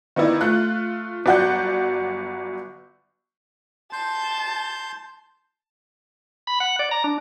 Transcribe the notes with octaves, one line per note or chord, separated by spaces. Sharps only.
D#3 B3 D#4 E4 D5
A3 F4 F#6
G1 F#3 D5 F#5 F#6 G6
A5 C6 G6
B5
F#5
D5
A#5
D4